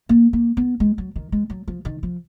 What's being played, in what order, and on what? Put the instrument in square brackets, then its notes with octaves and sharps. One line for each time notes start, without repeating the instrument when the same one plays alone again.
[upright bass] A#3
A#3
B3
G#3
F#3
D#3
G#3
F#3
F3
D#3
F3